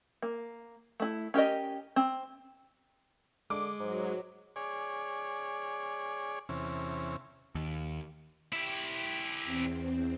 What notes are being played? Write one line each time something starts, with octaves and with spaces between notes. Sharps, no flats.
A#3
A3 E4
C#4 G4 A#4 D#5
C4
D3 G#3 D6
G#2 F#3
G#4 C#5 D5
E2 C3 C#4
D#2
E4 G4
E2 C4